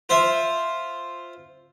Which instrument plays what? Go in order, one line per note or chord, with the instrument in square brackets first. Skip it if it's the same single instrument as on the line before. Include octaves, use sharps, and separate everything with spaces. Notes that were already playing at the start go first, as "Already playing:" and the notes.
[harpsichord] F4 C5 E5